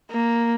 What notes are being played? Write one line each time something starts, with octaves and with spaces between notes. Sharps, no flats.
A#3